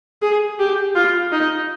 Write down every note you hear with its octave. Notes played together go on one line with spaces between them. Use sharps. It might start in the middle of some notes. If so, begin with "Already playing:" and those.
G#4
G4
F4
D#4